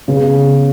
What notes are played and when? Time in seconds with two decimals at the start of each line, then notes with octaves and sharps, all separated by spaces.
0.08 C#3 B3